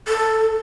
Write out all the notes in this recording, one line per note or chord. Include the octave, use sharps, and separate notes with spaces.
A4